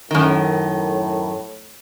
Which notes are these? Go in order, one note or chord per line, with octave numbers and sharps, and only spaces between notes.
F#2 A2 D#3